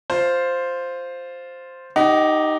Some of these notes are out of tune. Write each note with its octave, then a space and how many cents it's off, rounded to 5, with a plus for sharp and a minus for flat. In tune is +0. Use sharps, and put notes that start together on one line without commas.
F4 +0 C5 +0
D#4 +0 G4 +0 F#5 +40